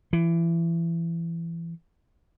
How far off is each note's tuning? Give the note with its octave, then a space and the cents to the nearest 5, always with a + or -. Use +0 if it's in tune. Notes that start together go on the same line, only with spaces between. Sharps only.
E3 +25